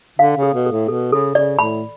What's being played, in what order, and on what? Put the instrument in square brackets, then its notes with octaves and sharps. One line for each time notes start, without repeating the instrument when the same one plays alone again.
[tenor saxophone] D3 [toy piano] F5
[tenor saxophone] C#3
[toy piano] A4
[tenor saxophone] B2
[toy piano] A4
[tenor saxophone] A2
[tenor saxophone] B2 [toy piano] A4
[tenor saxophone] C#3 [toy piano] A4
[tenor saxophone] C#3 [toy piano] D5
[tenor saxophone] A2 [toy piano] B5